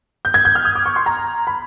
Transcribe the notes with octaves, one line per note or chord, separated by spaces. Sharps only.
G6
G#6
G6
F6
D#6
D6
C#6
C6
A#5
B5